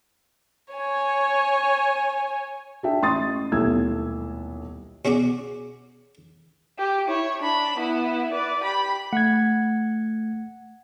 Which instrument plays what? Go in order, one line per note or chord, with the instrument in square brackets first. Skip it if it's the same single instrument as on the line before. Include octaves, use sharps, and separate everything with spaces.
[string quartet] C#5 G#5
[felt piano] D4 F#4 G#4 E5 G5
A1 C6 D#6 A6
D#1 B1 A3 E4 E6 G#6
[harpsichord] B2 C#4 F#4 G#4 D6
[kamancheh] G4
E4 C#5
D4 B5
B3 E4
B4 D5
G4 B5
[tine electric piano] A3 G#6 [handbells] F#5